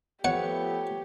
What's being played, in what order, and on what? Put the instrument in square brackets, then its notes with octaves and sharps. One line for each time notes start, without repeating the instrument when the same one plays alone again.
[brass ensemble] F3 A3 B3 [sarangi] G4 [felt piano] C#5 [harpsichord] F#5